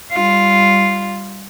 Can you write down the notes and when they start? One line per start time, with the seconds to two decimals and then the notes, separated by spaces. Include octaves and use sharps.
0.13 G3 F4